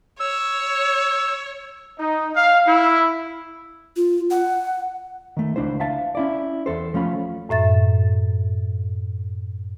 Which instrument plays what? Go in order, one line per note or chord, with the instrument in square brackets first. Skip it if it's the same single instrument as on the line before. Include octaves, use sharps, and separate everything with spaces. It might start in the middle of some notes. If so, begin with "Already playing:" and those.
[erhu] C#5 [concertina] E6
[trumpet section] D#4
F5
E4
[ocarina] F4
F#5
[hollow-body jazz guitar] D#3 A3
C#2 D4 E4 C5
E5 F5 A5
C#4 E4 D5
E2 A4 C5
F3 A3 C#4 F4 B5
[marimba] F#2 A2 E5 A6